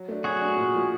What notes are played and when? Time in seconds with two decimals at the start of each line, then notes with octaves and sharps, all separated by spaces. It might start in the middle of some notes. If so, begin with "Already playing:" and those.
Already playing: F#3
0.08 A3 D4
0.24 F#3 F#4 G#4
0.41 A3 D4
0.57 A#2
0.74 F3 A3